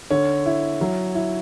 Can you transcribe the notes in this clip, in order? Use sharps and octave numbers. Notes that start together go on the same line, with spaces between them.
D3 C#5
E4
F#3
E4